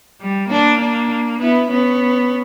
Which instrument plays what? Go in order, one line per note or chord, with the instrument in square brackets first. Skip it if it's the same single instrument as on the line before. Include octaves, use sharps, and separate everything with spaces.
[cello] G3
[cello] A#3 [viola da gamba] D4
[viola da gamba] D4
[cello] B3 [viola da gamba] E4
[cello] B3 [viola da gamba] C#4